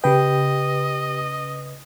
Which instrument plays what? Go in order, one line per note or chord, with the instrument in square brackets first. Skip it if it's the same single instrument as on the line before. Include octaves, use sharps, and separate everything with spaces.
[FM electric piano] C#3 B4 [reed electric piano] G4 G5 [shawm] D#5